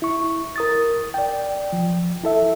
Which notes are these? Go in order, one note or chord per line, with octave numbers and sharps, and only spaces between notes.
E4 C#6
A#4 D#6 A6
D5 G5
F3
E4 A4 E5